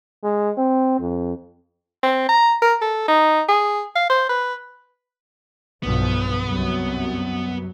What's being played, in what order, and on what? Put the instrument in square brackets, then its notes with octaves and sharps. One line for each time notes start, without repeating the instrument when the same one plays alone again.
[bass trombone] G#3
C4
F2
[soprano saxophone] C4
A#5
A#4
A4
D#4
G#4
F5
C5
B4
[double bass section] B1 G2 F3 [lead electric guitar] B3
[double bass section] C2 F#2 F#3